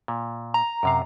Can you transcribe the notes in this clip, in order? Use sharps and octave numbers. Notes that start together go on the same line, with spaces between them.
A#2
A#5
F#2 C3 F5